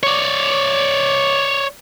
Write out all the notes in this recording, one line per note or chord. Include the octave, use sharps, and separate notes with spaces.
C#5 D5